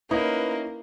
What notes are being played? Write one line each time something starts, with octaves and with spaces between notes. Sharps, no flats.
A#3 C#4 D#4 E4 B4